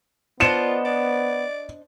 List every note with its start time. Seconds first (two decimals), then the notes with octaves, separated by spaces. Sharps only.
0.40 B3 D4 F4 C5 D#5 C#7 E7
0.85 D5